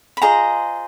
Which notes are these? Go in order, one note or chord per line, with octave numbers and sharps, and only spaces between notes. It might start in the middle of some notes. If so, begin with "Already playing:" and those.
B5
F4 G#4 C5 D#5 A#5